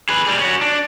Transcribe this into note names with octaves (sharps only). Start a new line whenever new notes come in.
G#4 B4
G3 G#4
C#4 F#4
D4